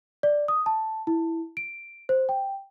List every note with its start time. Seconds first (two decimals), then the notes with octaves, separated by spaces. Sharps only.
0.23 D5
0.48 D#6
0.66 A5
1.07 E4
1.57 D7
2.09 C5
2.29 G5